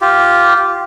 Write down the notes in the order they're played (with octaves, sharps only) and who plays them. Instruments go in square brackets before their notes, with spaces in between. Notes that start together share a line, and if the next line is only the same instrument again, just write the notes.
[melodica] F4 G4